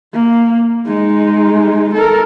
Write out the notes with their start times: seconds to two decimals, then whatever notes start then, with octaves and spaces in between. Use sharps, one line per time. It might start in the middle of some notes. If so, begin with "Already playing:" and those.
0.13 A#3
0.86 G#3 D#4
1.94 A4 A#4